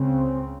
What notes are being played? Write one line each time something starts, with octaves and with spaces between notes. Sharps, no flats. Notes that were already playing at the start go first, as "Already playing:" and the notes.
Already playing: C#2 C#3 C4